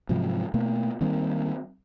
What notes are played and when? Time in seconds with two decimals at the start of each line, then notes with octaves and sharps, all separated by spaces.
0.09 G#2 C3 F3 F#3
0.54 B2 A3 A#3
1.01 D#3 G3 A#3 C4